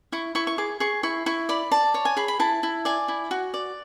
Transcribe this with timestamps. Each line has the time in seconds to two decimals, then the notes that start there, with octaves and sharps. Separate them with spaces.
0.12 E4 C#6
0.35 E4 C#6
0.47 C#6
0.58 G#4 D6
0.80 G#4 C#6
1.03 E4 C#6
1.26 E4 C#6
1.49 D5 B5
1.72 D5 A5
1.94 C#5
2.05 G#5
2.17 G#4 B5
2.28 B5
2.40 E4 A5
2.63 E4
2.85 D5 G#5
3.08 E4
3.31 F#4
3.54 D5